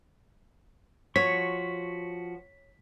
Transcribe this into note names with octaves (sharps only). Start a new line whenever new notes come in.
F3 F#4 C#5 C#6 B6